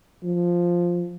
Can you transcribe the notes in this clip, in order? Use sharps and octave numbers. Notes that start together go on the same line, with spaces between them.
F3